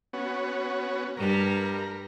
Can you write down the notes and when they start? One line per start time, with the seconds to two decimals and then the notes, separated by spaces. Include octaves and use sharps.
0.13 B3 C#4 F#4
1.17 G2 G3 A#4